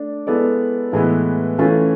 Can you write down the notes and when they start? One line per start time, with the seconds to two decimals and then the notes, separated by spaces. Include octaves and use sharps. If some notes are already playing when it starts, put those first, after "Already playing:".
Already playing: A3 D4
0.27 G#3 B3 E4 A4 D5
0.93 A2 E3 G#3 B3 E4
1.59 E3 A3 C#4 F4